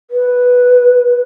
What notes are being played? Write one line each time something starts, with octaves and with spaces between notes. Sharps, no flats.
B4